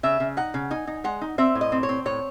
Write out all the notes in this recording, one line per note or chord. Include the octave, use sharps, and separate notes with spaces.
C#3 E5
C#3
D#4 F#5
C#3
D#4 G#5
D#4
G#3 F#5
D#4
C4 E5
A2
D#5
C4
C#5
C4
A2 C#5